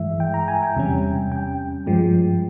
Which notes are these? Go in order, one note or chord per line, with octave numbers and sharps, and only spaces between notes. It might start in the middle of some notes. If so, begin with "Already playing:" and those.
Already playing: G2 E3 G#3 E5
G5
A#5
G#5
G5
E2 C3 G3 C#4
G5
G2 F3 G#3